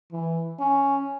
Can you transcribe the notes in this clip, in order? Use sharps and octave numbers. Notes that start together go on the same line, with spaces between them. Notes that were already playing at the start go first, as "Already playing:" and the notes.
E3
C#4